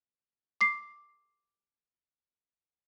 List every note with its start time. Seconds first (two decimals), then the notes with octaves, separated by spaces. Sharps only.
0.61 D6 C7